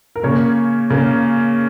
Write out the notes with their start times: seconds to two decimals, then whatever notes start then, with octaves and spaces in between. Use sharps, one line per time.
0.16 A#4
0.23 C#3 A#3 C#5
0.90 C#3 A#3